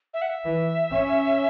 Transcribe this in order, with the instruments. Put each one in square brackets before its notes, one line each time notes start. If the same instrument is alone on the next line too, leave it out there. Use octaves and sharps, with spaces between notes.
[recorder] E5
F#5
E5
[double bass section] E3
C#4